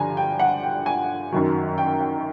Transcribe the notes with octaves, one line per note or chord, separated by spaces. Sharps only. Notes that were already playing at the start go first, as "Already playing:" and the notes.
Already playing: G2 D3 F3 G#5 A#5
G5
F#5
G5
G#5
F#2 D#3 F#3
G5
G5